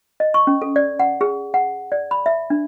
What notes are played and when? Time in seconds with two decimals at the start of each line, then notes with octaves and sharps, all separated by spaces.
0.20 D#5
0.34 C#6
0.47 C#4
0.62 A4
0.76 D5
0.99 F#5
1.21 G#4
1.54 F#5
1.92 D5
2.11 B5
2.26 E5
2.50 D4